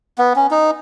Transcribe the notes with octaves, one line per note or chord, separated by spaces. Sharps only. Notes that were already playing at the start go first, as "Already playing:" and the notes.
B3
C#4
D#4